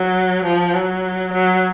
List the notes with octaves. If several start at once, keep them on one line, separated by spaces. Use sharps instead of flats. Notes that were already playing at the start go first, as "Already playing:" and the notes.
Already playing: F#3
F3
F#3
F#3